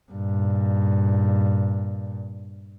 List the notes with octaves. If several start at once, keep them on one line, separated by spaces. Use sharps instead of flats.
G2 A#2